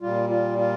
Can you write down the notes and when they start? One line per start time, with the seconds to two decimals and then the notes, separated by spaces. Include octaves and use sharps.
0.02 A#2 G3 F4
0.30 F4
0.59 F4